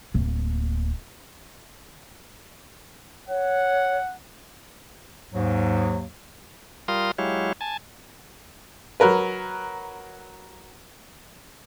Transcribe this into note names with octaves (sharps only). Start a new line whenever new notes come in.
D1 A#3
C#5 F#5
D#2 G#2 F#3
G3 F4 A#4 F5 C6 D#6
F#3 G#3 E4 G4 C#5 F5
G#5 A5
F#3 A#4 B4